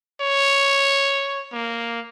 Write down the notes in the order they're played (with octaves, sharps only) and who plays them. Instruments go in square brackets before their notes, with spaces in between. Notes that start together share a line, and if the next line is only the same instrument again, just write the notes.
[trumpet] C#5
A#3